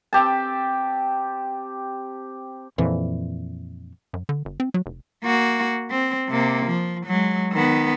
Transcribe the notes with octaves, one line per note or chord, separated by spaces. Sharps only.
C4 G4 A5
F2 A#2 E3
F#2
D3
G1
C4
F#3
F1
A#3 F#4
C4
C3 A#3
F3
F#3 G#3
D#3 B3